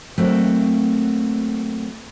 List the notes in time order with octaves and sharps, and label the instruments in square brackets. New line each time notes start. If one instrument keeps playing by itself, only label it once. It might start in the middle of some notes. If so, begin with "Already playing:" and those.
[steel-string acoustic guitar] F#3 A3 A#3 C4